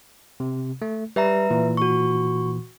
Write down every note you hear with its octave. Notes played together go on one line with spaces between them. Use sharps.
C3
A3
G3 B4 E5 A#5
A#2 E3
F#4 C#6